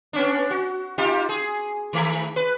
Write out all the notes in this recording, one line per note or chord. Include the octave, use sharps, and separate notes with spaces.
B3 C#4 D4
F#4
D#4 F4 G4
G#4
D#3 A3
B4